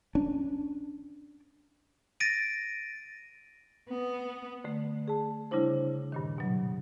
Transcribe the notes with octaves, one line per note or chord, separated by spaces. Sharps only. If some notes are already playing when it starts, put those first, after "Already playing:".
C#4 D4
A6 A#6 D7 D#7
B3
D3 A3
G#4 A5
C#3 G3 D4 E4 C5
G2 A#2 D#3
B2 F#3